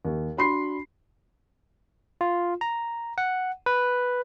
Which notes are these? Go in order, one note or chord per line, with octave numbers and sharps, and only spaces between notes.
D#2
D4 F#4 B5 C6 C7
F4
A#5
F#5
B4